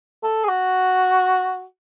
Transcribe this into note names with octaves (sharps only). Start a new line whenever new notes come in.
A4
G#4
F#4